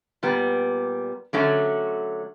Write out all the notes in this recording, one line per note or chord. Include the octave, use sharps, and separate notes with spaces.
A#2 G3 B3
D3 F#3 A3 C#4 F#4